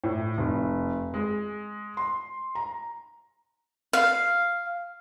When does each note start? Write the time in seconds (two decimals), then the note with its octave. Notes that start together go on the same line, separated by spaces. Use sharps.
0.04 A2
0.37 F1
1.14 G#3
1.97 C6
2.55 A#5
3.93 F5